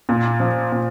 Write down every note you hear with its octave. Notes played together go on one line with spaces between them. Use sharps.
A#2
F3
A#2